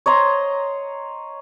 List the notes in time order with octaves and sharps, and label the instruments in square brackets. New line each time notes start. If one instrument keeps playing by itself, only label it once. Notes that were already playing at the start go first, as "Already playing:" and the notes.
[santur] C#5 D#5 A#5 C6